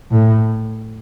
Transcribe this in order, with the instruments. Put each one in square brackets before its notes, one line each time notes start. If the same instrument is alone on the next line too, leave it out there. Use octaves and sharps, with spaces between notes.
[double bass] A2